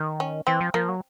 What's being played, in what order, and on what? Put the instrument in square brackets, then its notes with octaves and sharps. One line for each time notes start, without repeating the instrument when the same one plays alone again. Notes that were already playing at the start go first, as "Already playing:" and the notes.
Already playing: [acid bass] D#3
[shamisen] C#4
[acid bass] E3 [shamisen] C4
[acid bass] F3
[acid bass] F3 [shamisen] A#3
[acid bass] F#3